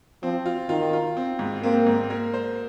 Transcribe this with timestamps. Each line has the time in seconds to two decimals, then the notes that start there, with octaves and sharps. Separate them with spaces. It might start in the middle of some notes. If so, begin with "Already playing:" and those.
0.23 F3 C4
0.46 F4
0.69 D#3 F4
0.93 F4
1.17 C4
1.39 G#2
1.63 A#3 C4
1.86 G#2
2.10 A#3
2.34 C5